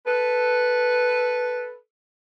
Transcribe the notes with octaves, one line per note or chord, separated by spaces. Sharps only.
A4 B4